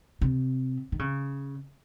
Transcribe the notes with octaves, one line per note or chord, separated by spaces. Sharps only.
C3
D#3
C#3